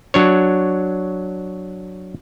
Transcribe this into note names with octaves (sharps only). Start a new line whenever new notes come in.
F#3 D4 C#5